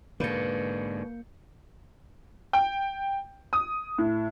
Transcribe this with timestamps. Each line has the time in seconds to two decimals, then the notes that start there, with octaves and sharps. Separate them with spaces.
0.20 G#2 B2 D3 A#3 B4 G6 C#7
2.53 G5
3.53 D#6
3.98 A2